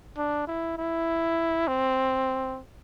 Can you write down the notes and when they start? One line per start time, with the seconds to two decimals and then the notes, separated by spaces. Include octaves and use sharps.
0.17 D4
0.47 E4
0.78 E4
1.68 C4